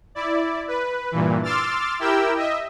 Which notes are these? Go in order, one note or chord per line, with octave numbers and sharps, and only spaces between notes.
E4 D5
B4
G2 A#2 E3
C6 D6 E6 F6 A6
E4 G4 A#4 G5 E6
D#5 E5